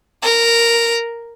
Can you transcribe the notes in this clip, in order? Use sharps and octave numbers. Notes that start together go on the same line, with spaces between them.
A#4